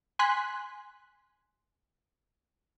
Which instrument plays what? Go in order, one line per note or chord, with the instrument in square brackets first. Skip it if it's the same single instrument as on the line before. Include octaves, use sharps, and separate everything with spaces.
[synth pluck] G#5 C6 F#6 B6